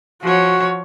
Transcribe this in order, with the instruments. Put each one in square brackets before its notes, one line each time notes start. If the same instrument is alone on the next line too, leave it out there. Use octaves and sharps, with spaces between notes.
[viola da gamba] F3 C#5 [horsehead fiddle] F#4